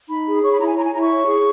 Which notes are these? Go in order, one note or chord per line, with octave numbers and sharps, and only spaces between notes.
D#4 B5
G#4
C#5 C#6
B5
E4 A#5
G#5
C#5 A#5
G#5
E4 A#5
C#6
C#5
G#4